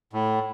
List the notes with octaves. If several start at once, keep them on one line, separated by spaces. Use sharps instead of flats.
A2